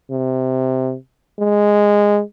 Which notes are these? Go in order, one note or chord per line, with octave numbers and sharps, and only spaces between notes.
C3
G#3